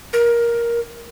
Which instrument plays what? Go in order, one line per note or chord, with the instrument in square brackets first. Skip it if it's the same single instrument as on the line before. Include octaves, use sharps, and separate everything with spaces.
[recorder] A#4